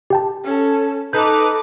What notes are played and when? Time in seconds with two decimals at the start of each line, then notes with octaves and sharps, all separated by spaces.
0.10 G4 G5 A5
0.44 C#4 A4
1.13 D#4 A4 B4 D6 G6